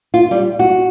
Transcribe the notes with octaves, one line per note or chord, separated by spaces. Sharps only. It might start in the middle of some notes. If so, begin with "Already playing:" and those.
F4
G3
F#4